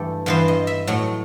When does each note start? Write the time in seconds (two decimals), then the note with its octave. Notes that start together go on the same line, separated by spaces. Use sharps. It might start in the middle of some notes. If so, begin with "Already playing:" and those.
Already playing: G2 E3 A3 G4 A4
0.26 G2 E3 B3 C5
0.48 D#5
0.67 E5
0.87 A2 F#3 A3